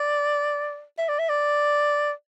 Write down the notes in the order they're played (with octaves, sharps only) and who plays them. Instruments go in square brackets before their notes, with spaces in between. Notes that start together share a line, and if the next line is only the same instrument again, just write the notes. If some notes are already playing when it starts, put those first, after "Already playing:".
Already playing: [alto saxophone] D5
E5
D5
E5
D5